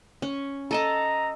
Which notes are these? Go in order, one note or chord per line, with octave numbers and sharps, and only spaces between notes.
C#4
A4 D#5 A5 A#5